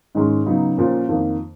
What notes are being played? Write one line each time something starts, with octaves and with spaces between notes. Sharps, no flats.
G#2 D#3 G#3 C#4
C#3 F#3 B3 D#4
A#2 F3 A#3 C#4
F2 D#3 A#3